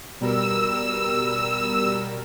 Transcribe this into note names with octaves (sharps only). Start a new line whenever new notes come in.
B2 G3 A#4 E6